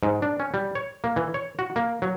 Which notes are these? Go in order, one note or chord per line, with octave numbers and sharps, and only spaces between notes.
G#2
D4
C#4
G3
C#5
A#3
E3
C#5
F#4
A#3
F#3